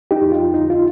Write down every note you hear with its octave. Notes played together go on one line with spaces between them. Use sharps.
D#4 G4
F2
F4
D2 D#4
F4